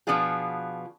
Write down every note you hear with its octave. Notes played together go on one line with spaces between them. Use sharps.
B2 F3 B3 D4 F4 G#4